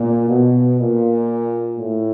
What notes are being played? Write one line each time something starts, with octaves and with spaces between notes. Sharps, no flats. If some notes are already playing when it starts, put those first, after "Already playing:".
Already playing: A#2
B2
A#2
A2